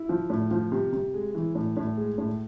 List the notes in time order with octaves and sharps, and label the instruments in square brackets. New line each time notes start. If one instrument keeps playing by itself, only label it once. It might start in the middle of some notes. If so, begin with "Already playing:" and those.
Already playing: [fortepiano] E4
F3
A2
F3
C3
C3
G#3
E3
A2
A2
G#3
A2